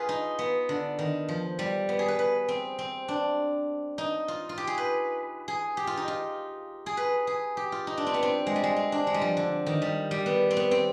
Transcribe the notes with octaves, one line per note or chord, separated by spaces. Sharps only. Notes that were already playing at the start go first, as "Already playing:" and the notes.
Already playing: F4 G#4 B4
D#4
B3
D3
D#3
F3
G3
B3
G#4
B4
B4
C4
C4
D4
D#4
F4
F4
G4
G#4
B4
G#4
G4
F4
D#4
F4
G#4
B4
G#4
G4
F4
D#4
D4
C4
B3
C4
G#3
G3
G#3
C4
D4
G#3
G3
F3
D3
D#3
G3
G3
B3
C4
B3
C4